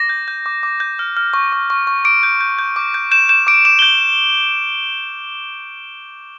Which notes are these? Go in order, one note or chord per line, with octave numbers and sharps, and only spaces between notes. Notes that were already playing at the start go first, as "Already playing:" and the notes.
Already playing: D6 A#6
G6
G6
D6
D6
G6
F6
F6
C#6
C#6
C#6
C#6
D6 D7
G6
G6
G6
D6
G6
G6 E7
G6 E7
D6 D7
D6 E7
G7
G6